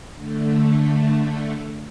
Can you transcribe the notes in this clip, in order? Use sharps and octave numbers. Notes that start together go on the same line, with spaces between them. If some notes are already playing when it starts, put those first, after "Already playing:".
D3 A3